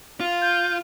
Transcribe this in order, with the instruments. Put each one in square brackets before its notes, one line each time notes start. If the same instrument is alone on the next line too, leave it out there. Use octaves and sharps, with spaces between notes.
[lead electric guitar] F4
[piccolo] G6